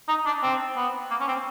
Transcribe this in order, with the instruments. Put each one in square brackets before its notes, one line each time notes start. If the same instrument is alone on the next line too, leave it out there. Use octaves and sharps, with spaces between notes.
[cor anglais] D#4
D4
C4
B3
A#3
C#4
C4